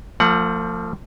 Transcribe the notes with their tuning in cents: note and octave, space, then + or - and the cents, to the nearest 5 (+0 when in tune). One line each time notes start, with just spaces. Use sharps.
F3 +0 A3 +45 F#5 +0